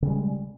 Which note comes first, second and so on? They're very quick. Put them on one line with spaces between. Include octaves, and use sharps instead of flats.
C#3 C4 G3 G#3